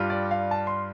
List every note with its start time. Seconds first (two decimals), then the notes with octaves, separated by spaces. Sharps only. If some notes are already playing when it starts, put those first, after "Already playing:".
Already playing: G2 G3 F4
0.10 D5
0.31 F5
0.51 A5
0.67 C6